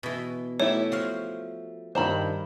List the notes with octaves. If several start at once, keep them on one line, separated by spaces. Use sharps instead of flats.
B2 E3
A3 E4 G4 C#5
F3 F#4 F5
G2 D#3 C5 A#5 B5